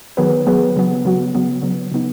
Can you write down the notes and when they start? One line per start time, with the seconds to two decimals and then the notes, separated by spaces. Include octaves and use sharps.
0.17 D#3 F#3 B3 G#4 B4
0.47 D#3 F#3 B3 G#4 B4
0.76 C#3 F#3 B3 F#4
1.05 C#3 F#3 B3 F#4
1.35 C#3 F#3 B3
1.63 C#3 F#3 B3
1.92 C#3 B3 D#4